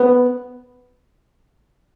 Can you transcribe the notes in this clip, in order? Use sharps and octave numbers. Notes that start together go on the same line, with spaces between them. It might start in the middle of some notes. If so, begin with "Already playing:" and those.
Already playing: B3